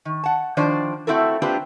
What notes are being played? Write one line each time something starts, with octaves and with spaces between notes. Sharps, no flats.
D#3
F#5 A5
D#3 F3 D4 C5 D5
A3 C4 E4 F#4 A4 A#4
A#3 C4 D4 F4 G4 B4